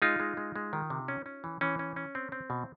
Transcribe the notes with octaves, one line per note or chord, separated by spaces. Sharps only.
G#3 D#4 F4
G#3
G#3
G#3
D#3
C3
C#4
C#4
E3
E3 C#4
C#4
C#4
C4
C4
B2